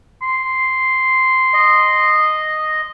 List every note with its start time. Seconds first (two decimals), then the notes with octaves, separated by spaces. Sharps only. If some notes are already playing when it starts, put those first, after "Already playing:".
0.22 C6
1.53 D#5